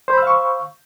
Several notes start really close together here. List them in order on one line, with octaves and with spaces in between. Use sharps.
C5 B5 E6 F5 C#6